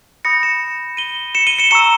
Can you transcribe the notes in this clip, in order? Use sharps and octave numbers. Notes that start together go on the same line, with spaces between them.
B5 D#6 G6 A#6 C#7
C#7 E7
D#7 G7
C#7 E7
D#7 G7
C#7 E7
A#5 C#6 E6 C#7 E7